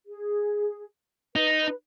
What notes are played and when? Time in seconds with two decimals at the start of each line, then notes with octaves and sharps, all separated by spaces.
0.07 G#4
1.36 D#4 B4